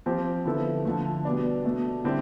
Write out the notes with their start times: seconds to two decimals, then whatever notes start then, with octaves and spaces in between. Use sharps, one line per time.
0.06 F3 C4 G4 C5
0.45 D3 F3 B3 E4 A4
0.85 D3 F3 A3
1.25 B2 G3 B3 D4
1.64 B2 A3 D4
2.04 D3 G3 C4 E4 G4